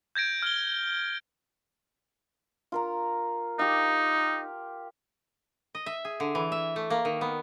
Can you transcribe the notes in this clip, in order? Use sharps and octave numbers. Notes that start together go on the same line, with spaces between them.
G6 G#6 A#6 D7
F6 G7
F4 A#4 A#5
D#4 G4 F5
D#5
E5
G#4
D3
E3
E5
A3
A#3
D#3
B3